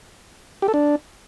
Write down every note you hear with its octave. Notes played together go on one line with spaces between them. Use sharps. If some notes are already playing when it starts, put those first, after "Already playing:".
G4
A4
D4